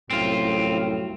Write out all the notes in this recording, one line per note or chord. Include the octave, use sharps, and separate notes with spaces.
C2 F#2 A2 C4 F4